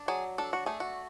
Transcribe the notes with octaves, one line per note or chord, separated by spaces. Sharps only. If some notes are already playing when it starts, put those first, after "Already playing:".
Already playing: D4
F#3 G#4
D4 A4
F#4
A3 G#4
F#4